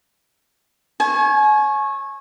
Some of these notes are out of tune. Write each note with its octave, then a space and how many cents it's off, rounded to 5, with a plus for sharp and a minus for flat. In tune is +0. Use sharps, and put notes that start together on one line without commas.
C#5 -20 G#5 +35